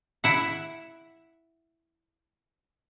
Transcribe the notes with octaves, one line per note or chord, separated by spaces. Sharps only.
E4 F#5